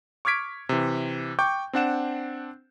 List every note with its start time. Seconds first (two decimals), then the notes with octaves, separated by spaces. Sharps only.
0.25 C#6 D6 F6 G#6 B6 D7
0.69 C3 E3
1.39 G5 C#6 D6 G6
1.73 C4 D4 F#5 E7